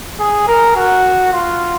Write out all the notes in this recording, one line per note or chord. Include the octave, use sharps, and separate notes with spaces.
G#4
A#4
F#4
F4